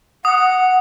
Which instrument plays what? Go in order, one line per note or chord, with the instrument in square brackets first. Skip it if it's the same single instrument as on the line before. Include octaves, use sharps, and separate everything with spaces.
[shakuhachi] F#5 [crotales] D#6